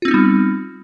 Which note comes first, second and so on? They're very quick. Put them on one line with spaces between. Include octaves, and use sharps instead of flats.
F4 C4 D#4 B3 G3